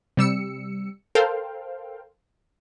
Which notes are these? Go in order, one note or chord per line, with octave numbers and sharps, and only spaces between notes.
C3 G3 E6 C#7
A4 A#4 C5 F5 G5